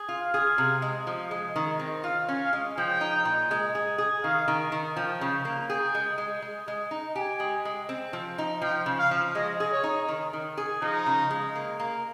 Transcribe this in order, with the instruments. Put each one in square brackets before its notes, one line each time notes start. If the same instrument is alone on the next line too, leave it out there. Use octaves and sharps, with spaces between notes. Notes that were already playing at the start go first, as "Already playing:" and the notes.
Already playing: [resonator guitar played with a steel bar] G#4
F4
[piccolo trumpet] F5
[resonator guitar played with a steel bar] G#4
C3
G#3
F3
G#3
D#3
C4
[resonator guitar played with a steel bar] F4 [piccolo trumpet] F5
[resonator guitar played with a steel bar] C#4
[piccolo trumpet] F5
[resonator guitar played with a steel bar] G#3
[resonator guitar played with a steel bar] F3 [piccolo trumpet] G5
[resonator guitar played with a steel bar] D#4
A#2
G#3
G#4
G#4
[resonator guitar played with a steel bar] D#3 [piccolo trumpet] F5
[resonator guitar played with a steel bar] D#3
D#3
[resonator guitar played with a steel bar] F3 [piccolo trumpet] G5
[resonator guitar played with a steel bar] C#3
A#3
[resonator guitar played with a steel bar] G#4 [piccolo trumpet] G5
[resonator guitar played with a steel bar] G#3
G#3
G#3
G#3
D#4
[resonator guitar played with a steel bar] G4 [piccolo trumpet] G#5
[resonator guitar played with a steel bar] G#3
G#3
C4
F3
D#4
[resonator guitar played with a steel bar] F3 [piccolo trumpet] G5
[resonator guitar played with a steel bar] C#3
[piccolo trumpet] F5
[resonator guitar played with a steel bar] F3
[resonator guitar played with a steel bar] G#3 [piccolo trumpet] D#5
[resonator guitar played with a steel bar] G#4
[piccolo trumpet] C#5
[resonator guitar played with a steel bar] D#4
D#3
D#3
G#4
[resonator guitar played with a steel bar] F3 [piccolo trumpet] D#4
[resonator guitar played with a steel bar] C#3
G#3
A#3
A#3